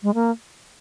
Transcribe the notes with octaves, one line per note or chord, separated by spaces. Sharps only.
G#3
A#3